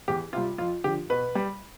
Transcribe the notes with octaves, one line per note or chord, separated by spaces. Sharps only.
E2 G4
C3 G3 F4
F2 F4
D3 F3 G4
B2 B4
G3